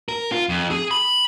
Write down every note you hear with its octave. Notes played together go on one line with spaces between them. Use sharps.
A#4
F4
F2
G#4
B5